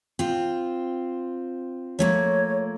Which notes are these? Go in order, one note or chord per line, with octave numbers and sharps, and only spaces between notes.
C4 F4
F3 A3 A#3 C#5